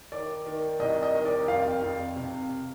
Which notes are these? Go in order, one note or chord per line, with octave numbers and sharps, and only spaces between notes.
D#3 D5
D#3
C2 D#5
D#5
D#3
D5
F2 F5
F2
C3